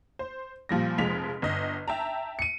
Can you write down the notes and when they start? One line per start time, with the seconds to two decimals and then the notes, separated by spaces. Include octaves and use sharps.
0.19 C5
0.69 A#2 F3 G3 A#6
0.98 F1 F3 G#3 B6 F7
1.42 G1 D#5
1.88 E5 G5 A5 A#5
2.39 C#7 D#7